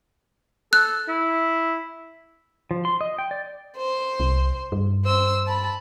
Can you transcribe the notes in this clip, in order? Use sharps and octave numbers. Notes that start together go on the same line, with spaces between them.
A4 F#6
E4
F3
C6
D#5
G5
D5
C5
C2
G2
C5 E6
A5 B5